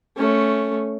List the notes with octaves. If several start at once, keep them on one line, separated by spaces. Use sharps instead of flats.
A3 C#4